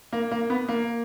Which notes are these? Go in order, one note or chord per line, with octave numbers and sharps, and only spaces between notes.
A#3
A#3
B3
A#3